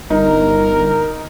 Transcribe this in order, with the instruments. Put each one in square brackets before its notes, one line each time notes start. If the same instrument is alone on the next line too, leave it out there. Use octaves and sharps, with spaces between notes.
[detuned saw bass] G1 [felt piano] D#4 [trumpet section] A#4